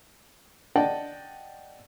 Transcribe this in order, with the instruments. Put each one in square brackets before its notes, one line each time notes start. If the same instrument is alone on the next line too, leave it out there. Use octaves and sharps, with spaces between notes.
[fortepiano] D5 D#5 F#5 G5 A5